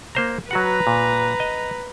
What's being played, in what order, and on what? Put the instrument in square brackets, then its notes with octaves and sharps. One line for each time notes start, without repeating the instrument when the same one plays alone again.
[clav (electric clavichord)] A#3 C5 A#5
[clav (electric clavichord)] F#3 F#4 F#5 [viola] B4 A#5
[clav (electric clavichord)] A#2
D#5